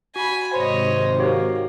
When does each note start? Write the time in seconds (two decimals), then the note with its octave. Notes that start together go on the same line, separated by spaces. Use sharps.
0.16 F#4 G#5 B5
0.53 G#2 C3 D#3 C5 C#5 D#5
1.19 A#3 F#4 G4 C#5